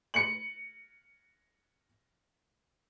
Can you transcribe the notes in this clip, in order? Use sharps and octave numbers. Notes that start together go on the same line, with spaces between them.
C#7 F#7